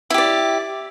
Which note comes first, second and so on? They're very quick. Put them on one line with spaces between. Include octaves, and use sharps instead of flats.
E4 G4 D5